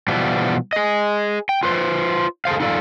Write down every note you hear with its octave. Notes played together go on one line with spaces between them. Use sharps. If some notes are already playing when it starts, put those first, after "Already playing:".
B2 E3 F3 G3 B3
G#4 D#5
G5
F4 B4 C5
G#4 A4 C5 F5
D#4 F4 A4 D5 F5